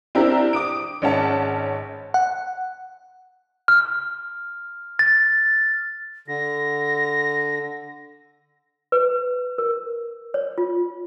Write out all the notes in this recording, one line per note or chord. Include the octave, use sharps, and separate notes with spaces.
C4 D4 E4 G4 A#4
D6 D#6 D7
G#1 G#2 C#4 C#5 F#5 A5
F#5
F6
A6
D3 A#6
B4
A#4
C#5
F4